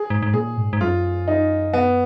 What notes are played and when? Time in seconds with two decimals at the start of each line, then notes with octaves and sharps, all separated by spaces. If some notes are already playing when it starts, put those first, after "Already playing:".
Already playing: G#4
0.10 G#2
0.23 G#2
0.34 A#2 G#4
0.57 G#2
0.73 G#2
0.80 F#2 F4
1.28 D#4
1.73 B3